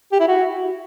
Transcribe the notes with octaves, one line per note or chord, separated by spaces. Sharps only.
G4
E4
F#4